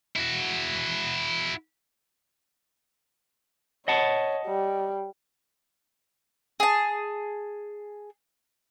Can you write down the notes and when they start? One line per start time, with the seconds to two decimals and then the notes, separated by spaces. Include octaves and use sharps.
0.16 E4 F#4
3.88 C#5 D#5 F#5 A5
4.46 G3
6.60 G#4 A5